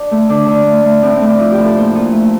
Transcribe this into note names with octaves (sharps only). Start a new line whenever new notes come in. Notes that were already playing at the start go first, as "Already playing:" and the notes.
Already playing: D4
A3
D3 D4
D3
A3
A3
A2 C4
C4
A3
D4
F3 E4
G4
A2
A4
A#2 C5
A#2
A3